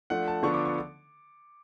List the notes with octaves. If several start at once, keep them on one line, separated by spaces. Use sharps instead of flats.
F3 A3 D4 F#5
A5
D3 F3 B3 D4 C#6
D6
C#6